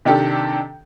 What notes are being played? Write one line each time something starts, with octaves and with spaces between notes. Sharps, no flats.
C3 D#3 D4 G4 A4